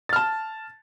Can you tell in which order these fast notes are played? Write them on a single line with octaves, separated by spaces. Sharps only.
A6 F6 A5